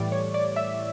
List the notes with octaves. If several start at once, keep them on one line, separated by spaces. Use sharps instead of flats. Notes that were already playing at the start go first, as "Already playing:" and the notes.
Already playing: A2 E3 G3 D5
C#5
D5
E5